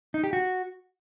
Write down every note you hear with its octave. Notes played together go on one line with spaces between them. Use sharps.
D#4
G4
F#4